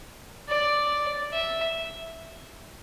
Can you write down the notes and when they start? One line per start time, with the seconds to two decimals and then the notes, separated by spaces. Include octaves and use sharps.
0.49 D5
1.33 E5